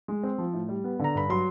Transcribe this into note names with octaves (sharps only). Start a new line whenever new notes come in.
G#3
C4
F3
A2
G3
B3
D3 A#5
G2 B5
F#3 C6